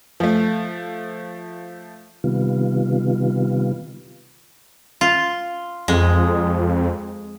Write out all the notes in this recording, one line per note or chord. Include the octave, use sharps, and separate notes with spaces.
F3 A3
C3 D#3 G3 B3 F4
F4
F2 G#3